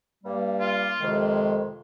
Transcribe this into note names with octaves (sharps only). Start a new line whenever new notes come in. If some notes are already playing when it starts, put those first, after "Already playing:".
G2 G3 A#3
F4
F2 C3 D#3 G#3